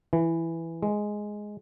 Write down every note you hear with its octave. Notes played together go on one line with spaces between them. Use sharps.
E3
G#3